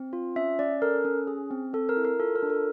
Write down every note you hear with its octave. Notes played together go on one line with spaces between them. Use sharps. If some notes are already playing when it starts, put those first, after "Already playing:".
Already playing: C4
F4
C#4 E5
C#4 D5
A4 A#4
C#4
G#4
C4
C4 A4
A#4
E4
A#4
F4 A4
A#4
D4
A4